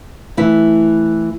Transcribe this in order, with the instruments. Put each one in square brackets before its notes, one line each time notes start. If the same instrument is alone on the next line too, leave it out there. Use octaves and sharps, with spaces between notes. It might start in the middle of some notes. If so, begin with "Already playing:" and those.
[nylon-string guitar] E3 A3 E4